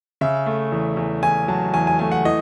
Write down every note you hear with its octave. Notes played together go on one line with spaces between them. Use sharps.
C#3 E5
A3
E2
E2
E2 G#5
F#3 A5
E2 G#5
G#5
A3 G#5
F#5
E3 D#5